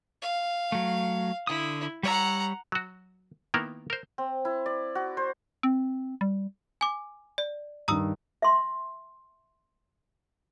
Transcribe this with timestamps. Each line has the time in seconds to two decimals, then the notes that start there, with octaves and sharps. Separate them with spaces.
0.22 F5
0.72 F#3 A3
1.47 D3 E4 D#6
2.03 G3 C#5 F#5 A#5 E6
2.72 F#3 F#4
3.54 D#3 A#3 B3 E4 A#4
3.90 A#4 C5
4.18 C4
4.45 E4
4.66 D5
4.95 F#4
5.17 C5
5.63 C4
6.21 G3
6.81 G#5 D6
7.38 D5
7.88 G2 D#3 A#5 D#6 E6
8.42 E5 C6